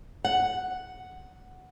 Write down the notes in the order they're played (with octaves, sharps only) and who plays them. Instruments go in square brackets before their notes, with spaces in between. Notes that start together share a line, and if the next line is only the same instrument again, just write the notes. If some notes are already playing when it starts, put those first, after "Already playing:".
[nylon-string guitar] F#5